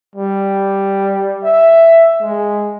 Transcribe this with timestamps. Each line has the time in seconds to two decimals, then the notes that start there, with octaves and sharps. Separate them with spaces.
0.16 G3
1.44 E5
2.22 G#3